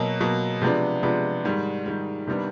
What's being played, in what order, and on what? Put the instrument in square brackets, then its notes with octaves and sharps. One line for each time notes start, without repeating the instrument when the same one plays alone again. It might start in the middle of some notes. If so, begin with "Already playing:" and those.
Already playing: [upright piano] B2 F#3 A#3
B2 F#3 A#3
C3 F3 G#3 B3 D4
C3 F3 G#3 B3 D4
G#2 D#3 G3
G#2 D#3 G3
C3 D#3 G3 B3 D4